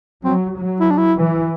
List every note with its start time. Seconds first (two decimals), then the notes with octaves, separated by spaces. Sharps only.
0.25 F#3 C4
0.57 F#3
0.80 E4
0.90 D4
0.98 E4
1.19 E3